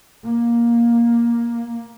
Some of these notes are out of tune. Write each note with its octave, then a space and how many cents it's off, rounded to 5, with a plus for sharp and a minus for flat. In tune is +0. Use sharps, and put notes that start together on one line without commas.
A#3 +10